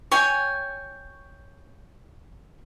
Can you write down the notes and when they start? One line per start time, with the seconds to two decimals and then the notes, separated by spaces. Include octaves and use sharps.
0.11 C#5 G5 G#5